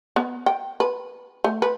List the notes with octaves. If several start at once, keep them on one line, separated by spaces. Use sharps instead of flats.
B3
G5
B4
A3
B4